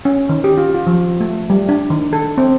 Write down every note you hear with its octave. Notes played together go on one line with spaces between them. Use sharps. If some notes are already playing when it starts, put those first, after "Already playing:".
C#4
D#3
G4
F4
F4
F3
A3
G3
D4
D#3
A4
C4